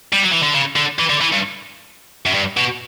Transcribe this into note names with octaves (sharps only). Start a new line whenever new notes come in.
G3
F#3
E3
D3
C#3
D3
E3
D3
E3
G2
F#2
G2
B2